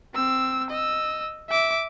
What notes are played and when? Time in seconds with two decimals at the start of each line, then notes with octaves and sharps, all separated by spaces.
0.15 C4 E6
0.70 D#5 E6
1.49 E5 D6